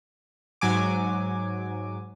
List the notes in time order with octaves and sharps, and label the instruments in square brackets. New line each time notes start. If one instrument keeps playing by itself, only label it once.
[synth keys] G#2 F#3 G#5 D6